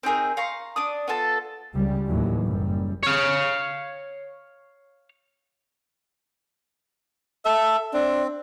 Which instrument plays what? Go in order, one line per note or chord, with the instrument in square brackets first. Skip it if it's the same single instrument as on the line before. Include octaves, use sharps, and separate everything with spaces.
[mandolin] C4 D#4 G#4 A#4
F5 A#5 C6 C#6
D4 D5 D#6
B3 F4 A4 A5
[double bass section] C#2 C#3 G3
D#2 A2 E3 F#3
F#1 F#2 G3
[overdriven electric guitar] C#5 F5
[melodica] A4 [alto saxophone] E5
[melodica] C4 [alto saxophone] D4